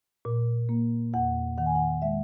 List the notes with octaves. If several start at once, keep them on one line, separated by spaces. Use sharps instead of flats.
A#2
A#3
E2 F#5
D#3 F#5
G#5
F#5
G#3 E5